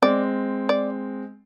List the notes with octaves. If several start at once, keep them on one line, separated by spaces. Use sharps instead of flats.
G#3 C4 D5
D5